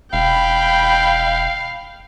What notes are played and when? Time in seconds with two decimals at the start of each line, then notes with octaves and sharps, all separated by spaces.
0.13 E1 F5 G5 B5